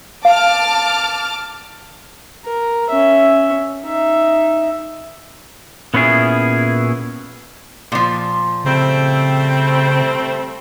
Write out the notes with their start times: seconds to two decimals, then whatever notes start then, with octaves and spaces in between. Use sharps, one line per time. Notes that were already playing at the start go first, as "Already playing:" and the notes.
0.25 F5 A5 D6 F6
2.45 A#4
2.90 C#4 E5
3.84 D#4 E5
5.94 A#2 B3 C#4 E4 G#4
7.92 A#2 F3
8.65 C#3 G3 A3 C4